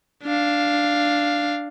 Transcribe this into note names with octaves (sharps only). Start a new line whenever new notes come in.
D4 F5